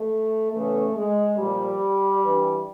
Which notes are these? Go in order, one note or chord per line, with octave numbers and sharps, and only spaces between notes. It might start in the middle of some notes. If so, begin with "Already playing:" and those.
Already playing: A3
E2 C#3 E3 A3
G#3
A#2 F3 G3
G2 E3